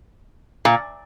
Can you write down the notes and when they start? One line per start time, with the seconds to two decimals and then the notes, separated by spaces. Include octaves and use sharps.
0.65 A#2